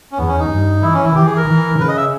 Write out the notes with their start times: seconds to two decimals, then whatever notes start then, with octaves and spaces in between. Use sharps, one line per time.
0.12 C#4
0.18 E2 B3
0.29 C#4
0.39 D#4
0.50 G2
0.82 E3 E4
0.94 C#4
1.04 E4
1.15 E3 G4
1.26 G#4
1.37 A#4
1.48 E3
1.80 C#3 B4
1.88 D#5
1.97 E5